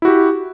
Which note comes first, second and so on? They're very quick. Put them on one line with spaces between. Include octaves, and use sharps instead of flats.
E4 F#4 G4